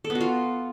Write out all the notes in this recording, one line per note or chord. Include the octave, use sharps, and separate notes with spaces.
A4
B3
F#4
F4